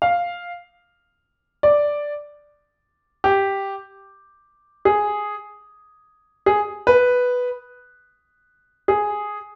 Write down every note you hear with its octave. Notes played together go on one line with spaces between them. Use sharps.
F5
D5
G4
G#4
G#4
B4
G#4